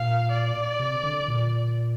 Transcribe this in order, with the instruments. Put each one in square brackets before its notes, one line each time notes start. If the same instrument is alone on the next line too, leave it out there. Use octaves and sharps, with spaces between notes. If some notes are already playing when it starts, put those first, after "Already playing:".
Already playing: [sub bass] A#2 [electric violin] F5
[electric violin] D5
[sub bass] C3
D3
A#2